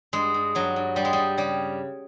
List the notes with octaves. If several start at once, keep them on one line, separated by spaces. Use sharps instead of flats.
G2 G#3
G2
G2 F#3
G2
G2 G3
G#3
G2 G3
C#3 G3